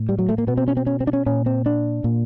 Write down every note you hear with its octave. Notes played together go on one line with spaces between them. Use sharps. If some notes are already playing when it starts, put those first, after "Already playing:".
Already playing: A2
G3
F#3
A3
A#3
B2 B3
C4
C#4
C4
C#4
C4
D4
C#4
A#2 C#4
C4
D4
A#2